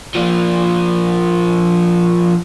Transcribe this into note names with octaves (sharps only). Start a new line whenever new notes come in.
F3 A#3